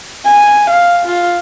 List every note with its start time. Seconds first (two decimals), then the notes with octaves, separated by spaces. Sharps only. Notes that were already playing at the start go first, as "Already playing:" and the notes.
0.25 G#5
0.70 F5
1.06 F4